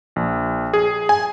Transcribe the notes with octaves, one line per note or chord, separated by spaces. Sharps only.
A#1
G#4
G#5